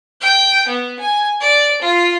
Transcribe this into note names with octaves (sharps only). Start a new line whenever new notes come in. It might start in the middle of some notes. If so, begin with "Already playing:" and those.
G5
B3
G#5
D5
F4